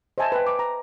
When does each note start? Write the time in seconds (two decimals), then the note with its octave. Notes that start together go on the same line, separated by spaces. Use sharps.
0.18 C5 D#5 E5 G#5 A5
0.32 B4 G5
0.47 D6
0.59 A#5